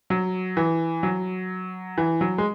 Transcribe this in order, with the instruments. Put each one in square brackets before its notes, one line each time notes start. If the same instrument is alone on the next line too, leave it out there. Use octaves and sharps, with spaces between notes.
[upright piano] F#3
E3
F#3
E3
F#3
G#3